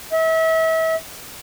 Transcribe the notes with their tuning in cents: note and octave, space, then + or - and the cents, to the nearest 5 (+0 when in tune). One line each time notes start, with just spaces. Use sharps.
E5 -35